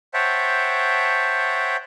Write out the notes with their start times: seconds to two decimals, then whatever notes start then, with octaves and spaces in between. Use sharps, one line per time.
0.14 C5 C#5 E5 F#5 G5 A5